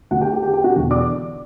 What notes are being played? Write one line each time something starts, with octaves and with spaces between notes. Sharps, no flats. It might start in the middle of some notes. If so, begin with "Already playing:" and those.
D2 D3 F#4 F#5
G4 G5
G4 G5
G4 G5
G4 G5
F#4 F#5
E1 E2 D3
D5 D6